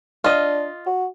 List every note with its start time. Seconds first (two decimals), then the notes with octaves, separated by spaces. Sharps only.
0.24 D4 F4 D#5
0.86 F#4